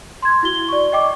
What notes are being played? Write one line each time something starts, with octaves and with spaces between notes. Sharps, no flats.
C6 G#6
E4 F#4 G7
D5 C#6
D#5 G5 D6